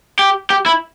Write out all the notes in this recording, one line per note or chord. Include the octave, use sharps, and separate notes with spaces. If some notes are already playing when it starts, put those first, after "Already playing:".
G4
G4
E4